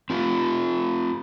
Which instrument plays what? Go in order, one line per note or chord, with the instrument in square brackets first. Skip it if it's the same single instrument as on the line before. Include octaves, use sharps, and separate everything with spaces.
[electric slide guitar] C4 F4 G4